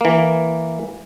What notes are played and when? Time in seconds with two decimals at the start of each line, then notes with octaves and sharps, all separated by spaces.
0.01 E3 A#3